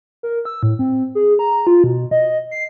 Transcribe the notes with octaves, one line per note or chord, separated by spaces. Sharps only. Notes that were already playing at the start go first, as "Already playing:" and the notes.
A#4
E6
A2
C4
G#4
A#5
F4
B2
D#5
C7